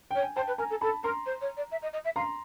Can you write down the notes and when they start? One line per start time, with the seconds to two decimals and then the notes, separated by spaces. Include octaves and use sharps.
0.11 C#5 G5
0.23 G#5
0.36 C5 G5 A5
0.47 B4
0.58 A#4 G#5 A#5
0.70 A4
0.81 A4 A5 B5
1.03 A#4 A#5 C6
1.26 C5
1.41 C#5
1.57 D5
1.71 E5
1.82 D#5
1.93 D#5
2.04 E5
2.16 F5 A#5 C6